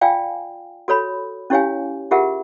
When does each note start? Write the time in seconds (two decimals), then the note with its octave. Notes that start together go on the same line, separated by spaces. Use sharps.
0.01 F4 D5 F5 G5 G#5
0.88 F#4 A4 C#5 B5
1.50 C#4 E4 G4 C#5 F5 G#5
2.11 F4 G4 G#4 A#4 E5 F#5